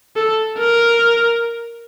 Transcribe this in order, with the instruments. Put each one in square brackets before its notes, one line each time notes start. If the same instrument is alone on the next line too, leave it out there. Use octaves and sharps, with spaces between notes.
[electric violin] A4
A#4